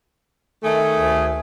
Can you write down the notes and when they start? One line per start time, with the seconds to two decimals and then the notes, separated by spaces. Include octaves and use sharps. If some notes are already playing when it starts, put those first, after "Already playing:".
0.64 D#3 A3 G#4 G#5
0.98 D2